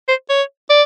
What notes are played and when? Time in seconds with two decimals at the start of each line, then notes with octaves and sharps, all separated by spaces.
0.08 C5
0.30 C#5
0.70 D5